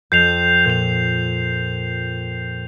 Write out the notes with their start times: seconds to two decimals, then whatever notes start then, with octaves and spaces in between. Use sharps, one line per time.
0.12 F2 F#6 G6 C7 F7
0.65 A#2 G6 F7